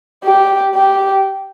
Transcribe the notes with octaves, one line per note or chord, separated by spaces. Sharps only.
G4
G4